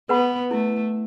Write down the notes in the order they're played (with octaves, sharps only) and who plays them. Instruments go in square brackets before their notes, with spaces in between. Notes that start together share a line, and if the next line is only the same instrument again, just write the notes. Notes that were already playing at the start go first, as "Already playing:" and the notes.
[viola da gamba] B3 [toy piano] B4 F#5 B5
[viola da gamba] A3 [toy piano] E4